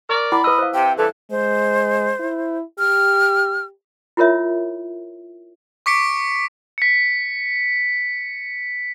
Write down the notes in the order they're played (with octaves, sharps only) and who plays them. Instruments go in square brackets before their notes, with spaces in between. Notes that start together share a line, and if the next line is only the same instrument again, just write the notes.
[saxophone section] A#4 D5 [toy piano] C#6
[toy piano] E4 F#5 D6 [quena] B5
[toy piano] B4 D#6 E6 [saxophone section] D#5
[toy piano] C5 F5
[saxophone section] C3 [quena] G5
[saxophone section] G2 E3 [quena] A4
[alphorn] G#3 [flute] C5
[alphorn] E4
[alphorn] G4 [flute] F6
[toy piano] E4 F4 A#4 C#5 E5
[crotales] C#6 D6 B6 C#7 D7
B6 C#7